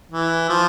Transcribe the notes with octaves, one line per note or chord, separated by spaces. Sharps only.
E3
F3